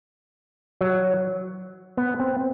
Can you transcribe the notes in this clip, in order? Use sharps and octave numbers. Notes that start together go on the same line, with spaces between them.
F#3
B3
C4